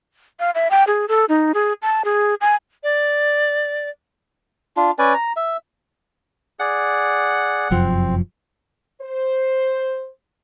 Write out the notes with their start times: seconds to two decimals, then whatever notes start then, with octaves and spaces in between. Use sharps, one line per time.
0.40 F5
0.55 E5
0.71 G5
0.87 G#4
1.08 A4
1.29 D#4
1.54 G#4
1.82 A5
2.05 G#4
2.41 G#5
2.83 D5
4.77 D4 F4
4.99 C#4 B4 D5 G#5
5.14 A#5
5.36 E5
6.60 G#4 D5 F#5
7.71 F1 F#2 F3 C4
9.02 C5